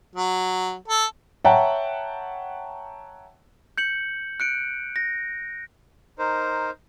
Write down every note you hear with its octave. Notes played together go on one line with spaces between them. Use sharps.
F#3
A4
C#5 E5 F#5 G5 A5 A#5
G6 C#7 F#7
F#6 C#7 D7
A#6
D#4 A#4 C5